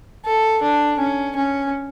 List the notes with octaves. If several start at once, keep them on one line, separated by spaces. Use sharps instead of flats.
A4
D4
C#4
C#4